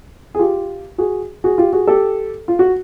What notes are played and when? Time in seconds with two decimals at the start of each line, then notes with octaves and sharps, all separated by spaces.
0.35 G#4
0.39 F4 G4
0.98 F#4 G#4
1.44 F#4 G#4
1.58 F4 G4
1.73 F#4 G#4
1.87 G4 A4
2.48 F4
2.59 F#4